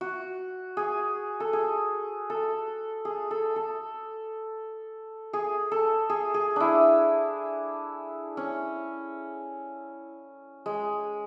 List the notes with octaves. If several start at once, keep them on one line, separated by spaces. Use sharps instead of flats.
F#4
G#4
A4
G#4
A4
G#4
A4
A4
G#4
A4
G#4
G#4
D4 E4
C#4
G#3